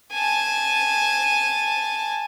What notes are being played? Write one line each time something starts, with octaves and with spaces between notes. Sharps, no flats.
G#5 A5